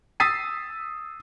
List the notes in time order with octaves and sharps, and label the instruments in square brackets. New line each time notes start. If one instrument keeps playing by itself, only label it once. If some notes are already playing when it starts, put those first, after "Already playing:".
[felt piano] D#6 E6 A6 B6 C7 D#7